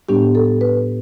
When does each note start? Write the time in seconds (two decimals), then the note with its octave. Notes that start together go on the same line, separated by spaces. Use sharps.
0.09 A2 G3 B3 D4 G4
0.35 A4
0.61 B4